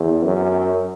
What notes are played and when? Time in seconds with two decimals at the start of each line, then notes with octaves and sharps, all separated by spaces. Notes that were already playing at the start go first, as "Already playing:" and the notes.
Already playing: E2
0.24 F#2